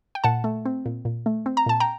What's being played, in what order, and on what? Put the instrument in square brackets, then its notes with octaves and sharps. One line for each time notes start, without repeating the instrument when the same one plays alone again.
[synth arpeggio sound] G5
A#2 F#5 A5
A3
C4
A#2
A#2
A3
C4
A#5
A#2 A5
G5 A#5